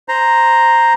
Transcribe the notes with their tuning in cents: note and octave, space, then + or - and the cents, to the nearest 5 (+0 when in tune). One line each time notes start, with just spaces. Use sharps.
C5 +0 A#5 +0